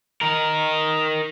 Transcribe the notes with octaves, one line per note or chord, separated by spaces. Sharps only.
D#4 A#4